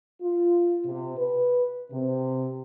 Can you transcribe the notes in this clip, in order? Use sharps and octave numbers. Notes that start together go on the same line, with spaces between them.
F4
C3
B4
C3